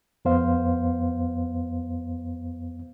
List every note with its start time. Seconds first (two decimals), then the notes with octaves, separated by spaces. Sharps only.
0.25 F2 B3 C5 F5